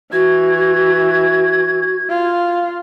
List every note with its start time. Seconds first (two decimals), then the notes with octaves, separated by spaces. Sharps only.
0.12 E3 F#4 G#6
2.09 F4